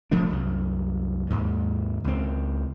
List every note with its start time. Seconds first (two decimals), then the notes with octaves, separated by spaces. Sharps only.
0.11 E1 F3 A3 D4
0.30 C2 F#2
1.30 D#2 G#2
2.04 C#2 C4